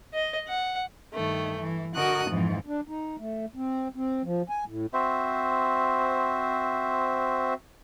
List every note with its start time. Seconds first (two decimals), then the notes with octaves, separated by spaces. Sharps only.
0.13 D#5
0.48 F#5
1.13 G2 D#3 A3
1.61 E3
1.96 D3 F#4 A#4 D#5 D#6 F#6
2.30 F2 G#2 E3 F3
2.67 D4
2.88 D#4
3.19 A3
3.56 C4
3.96 C4
4.24 F3
4.49 G#5
4.68 A2
4.94 C4 F#4 C5 E5